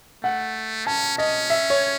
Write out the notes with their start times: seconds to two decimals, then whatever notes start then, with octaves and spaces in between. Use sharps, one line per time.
0.23 A3 F#5
0.86 C#4 A5
1.18 C#4 D#5
1.50 E5
1.70 C#5